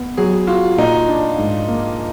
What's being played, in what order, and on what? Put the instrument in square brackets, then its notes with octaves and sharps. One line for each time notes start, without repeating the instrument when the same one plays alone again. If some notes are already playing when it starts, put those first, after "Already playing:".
Already playing: [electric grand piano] B3
[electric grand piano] F#3 [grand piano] G#4
[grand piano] F4 [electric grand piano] F#4
[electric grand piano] A#2 [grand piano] D#4
[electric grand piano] D4
G#2
A#3